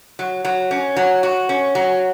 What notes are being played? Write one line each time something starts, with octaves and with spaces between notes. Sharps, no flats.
F#3
F#3
C#4
F#3
F#4
C#4
F#3